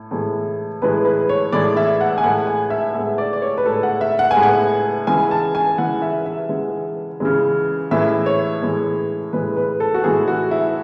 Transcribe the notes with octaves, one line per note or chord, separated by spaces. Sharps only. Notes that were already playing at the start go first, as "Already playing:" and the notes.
Already playing: A2
A2 E3 G#3
A2 E3 G#3 B4
B4
C#5
A2 E3 G#3 D5
E5
F#5
G#5
A2 G#3 F#5
G#5
E5
A2 G#3 E5
D5
D5
C#5
B4
A2 G#3 A4
F#5
E5
F#5
G#5
A2 G#3
F#5
C#3 E3 G#3 G#5
A5
G#5
C#3 E3 G#3 F#5
E5
E5
C#3 E3 G#3
C#3 E3 G#3
A2 E3 G#3 E5
C#5
A2 E3 G#3
A2 E3 G#3 B4
B4
A4
F#4
A2 E3 G#3 G#4
F#4
E4